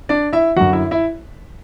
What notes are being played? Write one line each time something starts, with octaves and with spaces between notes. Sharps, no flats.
D4 D5
E4 E5
F#2 D3 F#3 F#4 F#5
E4 E5
E4 E5